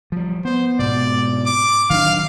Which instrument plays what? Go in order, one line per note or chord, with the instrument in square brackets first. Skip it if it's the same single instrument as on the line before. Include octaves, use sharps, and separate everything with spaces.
[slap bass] F3 G3
[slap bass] B3 [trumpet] C5
[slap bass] G#2 B2 [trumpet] D5
[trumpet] D6
[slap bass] D#3 F#3 D4 [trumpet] F5